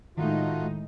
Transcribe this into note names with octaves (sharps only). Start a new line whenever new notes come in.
A2 D#3 G#3 A3 D#4 F4 F#4